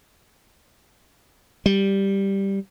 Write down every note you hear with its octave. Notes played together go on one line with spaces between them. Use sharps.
G3